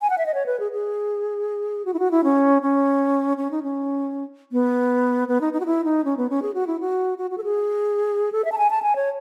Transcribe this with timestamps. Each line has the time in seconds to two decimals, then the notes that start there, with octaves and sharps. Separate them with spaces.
0.02 G#5
0.10 F#5
0.18 E5
0.26 D#5
0.34 C#5
0.46 B4
0.60 G#4
0.72 G#4
1.85 F#4
1.94 E4
1.99 F#4
2.11 E4
2.24 C#4
2.62 C#4
3.37 C#4
3.51 D#4
3.63 C#4
4.52 B3
5.28 B3
5.41 D#4
5.53 D#4
5.60 F#4
5.66 E4
5.84 D#4
6.05 C#4
6.17 B3
6.30 C#4
6.42 G#4
6.54 F#4
6.67 E4
6.80 F#4
7.18 F#4
7.31 F#4
7.38 A4
7.44 G#4
8.32 A4
8.45 E5
8.52 A5
8.58 G#5
8.70 A5
8.82 G#5
8.96 C#5